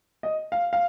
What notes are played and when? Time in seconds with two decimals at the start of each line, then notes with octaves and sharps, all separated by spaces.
0.23 D#5
0.52 F5
0.73 F5